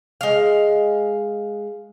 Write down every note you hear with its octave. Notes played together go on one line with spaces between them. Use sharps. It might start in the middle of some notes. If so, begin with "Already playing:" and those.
G#3 F5